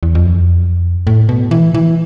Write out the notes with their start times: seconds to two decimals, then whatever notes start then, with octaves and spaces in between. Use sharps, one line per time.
0.03 E2
0.15 F2
1.07 A2
1.29 B2
1.51 E3
1.74 E3